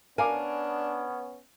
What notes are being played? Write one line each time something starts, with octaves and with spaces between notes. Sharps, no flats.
B3 C#4 D4 A#4 F5 G#5 D6